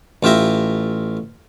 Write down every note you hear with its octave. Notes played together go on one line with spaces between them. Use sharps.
A1 F4 G4 E5 A#5